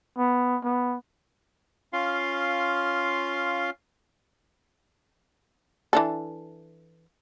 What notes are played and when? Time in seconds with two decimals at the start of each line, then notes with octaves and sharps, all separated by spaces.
0.17 B3
0.64 B3
1.93 C#4 F4 F5 C6
5.93 E3 D4 A4